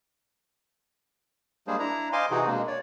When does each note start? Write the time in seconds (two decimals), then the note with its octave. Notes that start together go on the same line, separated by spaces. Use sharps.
1.67 G3 G#3 A#3 D4 G#4 C5
1.79 D4 E4 A#5
2.13 C5 D#5 F5 G#5 C6 D6
2.31 C3 E3 D#4 F#4 G#4
2.47 B2 G#3 A#3 D4
2.67 C#5 D5